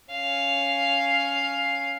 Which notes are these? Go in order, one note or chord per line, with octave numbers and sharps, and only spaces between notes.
C#4 F5